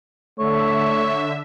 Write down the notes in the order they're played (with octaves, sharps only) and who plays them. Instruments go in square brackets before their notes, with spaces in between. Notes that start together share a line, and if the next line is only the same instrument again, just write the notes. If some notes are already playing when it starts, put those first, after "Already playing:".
[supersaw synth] D3 E5 [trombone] A3 [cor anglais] C#5